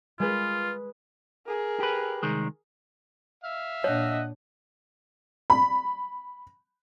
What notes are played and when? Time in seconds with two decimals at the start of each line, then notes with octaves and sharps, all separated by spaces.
0.19 G#3 F4 G#4 B4
1.47 G#4 A#4
1.80 G4 B4
2.23 C2 D#3 G#3
3.44 E5 F5
3.84 A#2 D4 C#5 D#5 F#5
5.50 B5